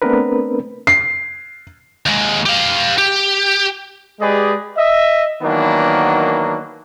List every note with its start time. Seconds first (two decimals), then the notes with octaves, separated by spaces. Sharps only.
0.02 A3 B3 C4 D4 A#4 B4
0.87 C7
2.06 D#2 G#3
2.46 G4 F5
2.98 G4
4.20 G#3 G4 G#4 B4 D5 D#5
4.77 D#5 E5
5.43 D#3 E3 F#3 A#3 B3 D4